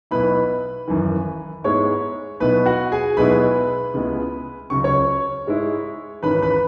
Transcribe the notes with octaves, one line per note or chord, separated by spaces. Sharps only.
B1 B2 B3 E4 B4 B5
G#1 F#2 E3
G#2 G#3 B3 E4 C#5 C#6
B1 B2 B3 E4 B4 B5
F#4 F#5
G#4 G#5
B1 B2 G#3 B3 E4 B4 B5
C#2 C#3 G#3 B3 E4
C#2 C#3 F#3 C#6
C#5 C#6
G#2 G#3 E4
G#1 G#2 E3 C#4 B4 B5
B4 B5